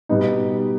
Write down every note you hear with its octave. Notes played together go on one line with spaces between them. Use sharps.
B2 G3 B3 D#4